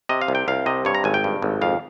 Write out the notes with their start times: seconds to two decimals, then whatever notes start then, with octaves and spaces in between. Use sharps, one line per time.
0.09 C3 D#5
0.22 F5
0.28 C2
0.35 G5
0.48 C2 F5
0.66 C3 D#5
0.85 G2 C#5
0.95 A#5
1.04 G#1 G#5
1.14 G5
1.24 G2
1.42 G#1
1.62 F2 F5